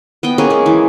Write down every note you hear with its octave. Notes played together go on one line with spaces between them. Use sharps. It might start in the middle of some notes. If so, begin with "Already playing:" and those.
B3 D#5 G5
A#3 C#4 G#4
G#3
E3